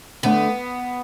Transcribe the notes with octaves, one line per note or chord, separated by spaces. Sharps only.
D3 A3 B3 D4